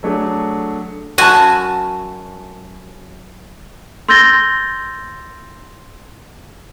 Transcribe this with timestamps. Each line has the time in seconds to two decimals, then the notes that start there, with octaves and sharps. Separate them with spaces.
0.03 F#3 A3 D4 G#4
1.18 F#2 F#4 G#5 A5
4.09 C6 E6 G6 A6 A#6 G7